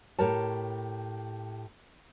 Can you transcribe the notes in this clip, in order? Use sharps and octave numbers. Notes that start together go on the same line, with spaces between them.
A2 G4 A#4 C#5 A5